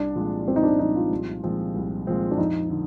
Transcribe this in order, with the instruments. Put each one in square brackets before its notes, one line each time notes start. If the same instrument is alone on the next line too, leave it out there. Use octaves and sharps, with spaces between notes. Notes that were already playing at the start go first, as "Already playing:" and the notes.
Already playing: [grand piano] C2 [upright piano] D4
[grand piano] A#2 F3 G#3 C4
[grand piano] C2 [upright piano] C4
[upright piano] D#4
D4
[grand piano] A#2 F3 G#3 C4 [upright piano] D#4
[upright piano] F4
[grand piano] C2
A#2 F3 G#3 C4
C2
A#2 F3 G#3 C4
[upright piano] D4
[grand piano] F2 [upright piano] D#4
[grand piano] D3